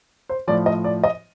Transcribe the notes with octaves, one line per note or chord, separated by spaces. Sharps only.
C5
A2 F3 D5
D#5
D5
D#5